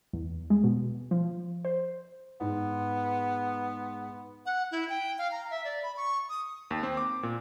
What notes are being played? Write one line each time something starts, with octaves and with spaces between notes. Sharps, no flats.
E2
G#3
B2
F3
C5
G#2 B3
F#5
E4
G5
F5
A#5
E5
D5
B5
C#6
D#6
D#2
C4
D6
A#2